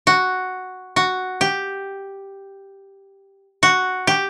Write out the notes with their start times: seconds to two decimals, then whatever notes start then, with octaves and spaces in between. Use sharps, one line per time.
0.07 F#4
0.96 F#4
1.41 G4
3.63 F#4
4.07 G4